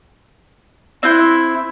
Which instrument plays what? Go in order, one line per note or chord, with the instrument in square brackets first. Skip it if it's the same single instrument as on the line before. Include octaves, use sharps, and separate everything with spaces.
[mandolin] C4 F#6 G6 [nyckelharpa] E4